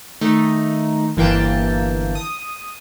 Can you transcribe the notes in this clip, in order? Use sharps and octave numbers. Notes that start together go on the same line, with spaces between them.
D#3 A3 D#4
G1 E3 A#3 G5 A5
D#6